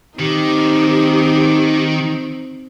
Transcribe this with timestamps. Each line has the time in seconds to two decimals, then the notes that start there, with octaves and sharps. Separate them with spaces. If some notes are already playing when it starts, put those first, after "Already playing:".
0.19 D#3 C4 D#4 G4